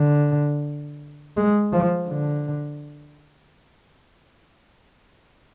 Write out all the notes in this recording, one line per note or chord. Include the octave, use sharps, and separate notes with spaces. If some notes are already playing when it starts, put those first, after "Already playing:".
Already playing: D3
G#3
F3
D3